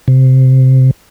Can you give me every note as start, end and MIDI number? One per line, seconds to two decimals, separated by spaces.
0.08 0.91 48